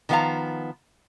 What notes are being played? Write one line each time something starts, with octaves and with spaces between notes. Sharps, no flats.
D#3 F3 B3 C5 F5 A#5